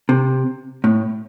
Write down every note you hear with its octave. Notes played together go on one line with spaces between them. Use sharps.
C3
A2